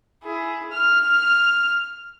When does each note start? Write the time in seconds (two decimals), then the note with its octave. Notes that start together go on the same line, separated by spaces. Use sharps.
0.23 E4 G#4
0.72 F6